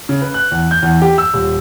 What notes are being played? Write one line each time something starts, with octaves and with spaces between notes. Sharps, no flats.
C#3
B4
F#6
E2
G6
E2
G4
E6
D#1